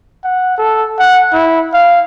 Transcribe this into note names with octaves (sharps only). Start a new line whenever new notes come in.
F#5
A4
F#5
E4
F5